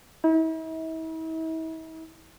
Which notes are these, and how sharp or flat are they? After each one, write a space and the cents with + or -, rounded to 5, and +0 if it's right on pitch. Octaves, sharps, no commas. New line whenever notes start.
E4 -45